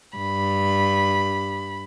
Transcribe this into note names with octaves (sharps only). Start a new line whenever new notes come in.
G2 B5